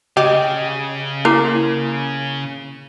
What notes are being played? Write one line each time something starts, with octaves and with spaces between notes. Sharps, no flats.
C#3 G4 D#5
A#3 E4 A#4 D6